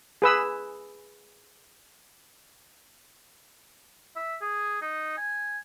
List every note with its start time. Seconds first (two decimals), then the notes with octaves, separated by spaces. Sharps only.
0.22 G#4 B4 E6
4.16 E5
4.41 G#4
4.81 D#4
5.18 G#5